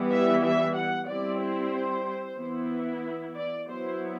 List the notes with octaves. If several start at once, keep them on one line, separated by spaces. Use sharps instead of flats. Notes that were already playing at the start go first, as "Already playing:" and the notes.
Already playing: E3 G3 B3
E5
E5
F#5
G3 C4 E4 D5
C5
E3 B3 E4
D5
F#3 B3 E4 C5